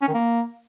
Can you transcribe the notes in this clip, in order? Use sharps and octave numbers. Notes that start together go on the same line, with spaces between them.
C#4
D#3
A#3